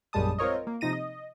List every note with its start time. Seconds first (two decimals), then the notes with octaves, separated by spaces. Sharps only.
0.13 A#1 F#2 G3 G#3 A5 D#6
0.38 C4 F4 A#4 C#5 D#5
0.67 A#3
0.81 C3 F3 D#4 A#6 D#7
0.93 D#5